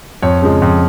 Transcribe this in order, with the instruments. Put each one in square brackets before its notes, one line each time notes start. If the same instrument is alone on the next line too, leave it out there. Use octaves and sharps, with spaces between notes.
[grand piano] F2 C#5
C#3 F3 G#3
F2